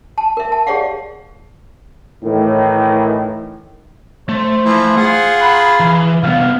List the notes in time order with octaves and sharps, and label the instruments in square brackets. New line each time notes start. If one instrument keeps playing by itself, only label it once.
[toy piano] A5
A#4 E5
A5
G4 G#4 C#5 D5 F5 F#5
[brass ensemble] A2 D#3 E3
[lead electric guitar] A3 [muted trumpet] C5
[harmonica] E3 F3
[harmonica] F4 G#4 [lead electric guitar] F#5
[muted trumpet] B5
[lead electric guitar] E3
[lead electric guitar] C2 B3 [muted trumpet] F5